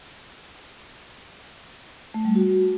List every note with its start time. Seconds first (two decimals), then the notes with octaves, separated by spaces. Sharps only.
2.14 A3
2.25 G3
2.35 F#4